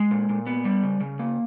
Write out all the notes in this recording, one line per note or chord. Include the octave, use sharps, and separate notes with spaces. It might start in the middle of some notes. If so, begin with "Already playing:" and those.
Already playing: G#3
A#2
A#2
B3
G3
C#3
C#3
A#3